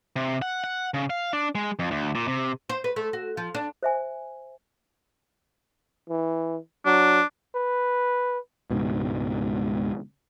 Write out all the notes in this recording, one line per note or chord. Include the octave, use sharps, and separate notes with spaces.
C3
F#5
F#5
C#3
F5
D4
G#3
F2
D2
A#2
C3
C5
B4
A3
F#4
F3
D4
C5 E5 G#5
E3
F#3 D4
B4
C#2 G#2 B2